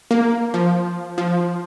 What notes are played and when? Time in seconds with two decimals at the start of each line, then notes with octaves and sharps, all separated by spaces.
0.11 A#3
0.54 F3
1.18 F3